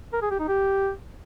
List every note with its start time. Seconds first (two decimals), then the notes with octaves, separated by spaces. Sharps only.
0.13 A#4
0.22 G#4
0.31 G4
0.40 D#4
0.48 G4